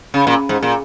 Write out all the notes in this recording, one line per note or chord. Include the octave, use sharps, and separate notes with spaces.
C#3
A#2
G#2
A#2